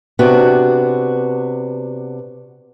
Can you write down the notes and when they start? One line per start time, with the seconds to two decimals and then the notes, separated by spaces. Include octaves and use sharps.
0.19 C3 B3 D4 F#4